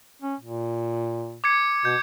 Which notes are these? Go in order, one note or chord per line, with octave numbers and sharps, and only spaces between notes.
C#4
A#2
D6 G#6 C#7
B2 G6